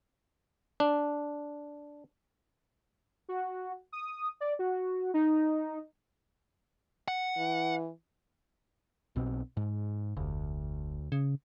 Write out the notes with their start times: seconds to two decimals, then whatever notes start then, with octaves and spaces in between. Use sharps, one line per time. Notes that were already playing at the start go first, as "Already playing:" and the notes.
0.80 D4
3.29 F#4
3.92 D#6
4.41 D5
4.59 F#4
5.14 D#4
7.08 F#5
7.37 E3
9.16 B1 B2 C4
9.57 G#2
10.17 F1 D2
11.12 C#3